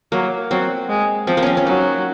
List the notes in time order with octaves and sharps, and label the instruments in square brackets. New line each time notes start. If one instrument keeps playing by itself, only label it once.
[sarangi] F#3 [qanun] A#3
[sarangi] F#3 [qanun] C4
[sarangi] G#3
[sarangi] F3 [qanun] C4
[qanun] A#3
C4 C#4
C#4
[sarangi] F#3 [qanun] D#4